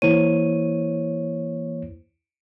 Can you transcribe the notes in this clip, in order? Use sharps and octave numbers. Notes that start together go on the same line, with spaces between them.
E3 A#3 E4 C5 C#5 D#7